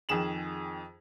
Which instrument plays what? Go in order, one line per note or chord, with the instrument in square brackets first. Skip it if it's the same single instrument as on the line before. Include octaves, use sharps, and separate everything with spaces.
[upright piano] F2 D#3 G#4 E7 F#7